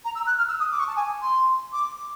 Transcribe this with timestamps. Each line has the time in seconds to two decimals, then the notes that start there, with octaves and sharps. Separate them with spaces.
0.05 A#5
0.15 E6
0.27 F#6
0.38 F6
0.48 E6
0.60 D#6
0.72 D6
0.79 C#6
0.88 A5
0.96 G#5
1.22 C6
1.73 D6